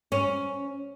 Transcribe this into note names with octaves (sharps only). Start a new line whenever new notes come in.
C#4